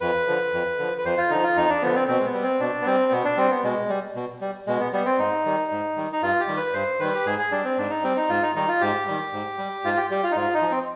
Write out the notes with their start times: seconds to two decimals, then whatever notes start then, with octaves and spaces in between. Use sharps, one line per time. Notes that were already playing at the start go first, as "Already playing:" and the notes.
0.01 F2 B4
0.27 D3 F3
0.53 F2
0.79 D3 F3
0.98 B4
1.05 F2 C5
1.18 F4
1.30 D3 F3 D#4
1.43 F4
1.56 F2 D#4
1.69 D4
1.82 D3 F3 B3
1.95 C4
2.08 B2 C4
2.20 G#3
2.25 B3
2.34 G3
2.43 C4
2.60 B2 D4
2.81 B3
2.86 G3 C4
3.12 B2 B3
3.25 D4
3.37 G3 C4
3.51 B3
3.64 B2 G#3
3.89 G3
4.15 B2
4.41 G3
4.67 B2 G#3
4.80 B3
4.93 G3 B3
5.06 C4
5.19 G#2 D#4
5.45 D#3 G3
5.71 G#2
5.97 D#3 G3
6.12 D#4
6.22 G2 F4
6.40 G4
6.48 D#3 G3
6.56 B4
6.74 G2 C5
7.00 D#3 G3 B4
7.15 G4
7.26 G#2 G#4
7.39 G#4
7.51 G3 D4
7.65 C4
7.78 G#2 D4
7.90 D#4
8.03 G3 C4
8.17 D#4
8.29 G#2 F4
8.42 D#4
8.55 D#3 G3 D#4
8.68 F4
8.81 G#2 G4
9.07 D#3 G3
9.33 G#2
9.58 G3
9.84 G#2 F4
9.97 G4
10.11 G3 G4
10.23 F4
10.31 D#4
10.36 G#2 F4
10.54 D#4
10.62 F3
10.71 C4